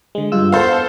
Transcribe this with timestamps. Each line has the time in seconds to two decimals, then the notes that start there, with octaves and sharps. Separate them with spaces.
0.15 D3 G#3
0.32 G2 F4 E6
0.52 B3 A4 C5 F5